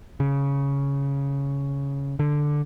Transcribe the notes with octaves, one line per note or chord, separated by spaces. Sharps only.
C#3
D3